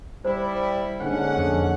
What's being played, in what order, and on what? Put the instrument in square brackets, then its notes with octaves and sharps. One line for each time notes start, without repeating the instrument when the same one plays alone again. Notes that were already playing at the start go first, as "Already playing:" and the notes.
[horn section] G3 E4 [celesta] C5
[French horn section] G#2 D3 [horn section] A#3 C#4 F#5
[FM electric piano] F2